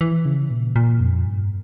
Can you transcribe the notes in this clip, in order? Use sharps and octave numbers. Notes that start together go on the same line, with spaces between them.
E3
C#3
A#2
A#2
F2
G2